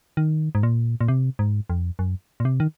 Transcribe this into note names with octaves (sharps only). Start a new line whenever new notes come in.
D#3
G#2
A#2
A#2
C3
G#2
F2
F#2
A#2
C3
D#3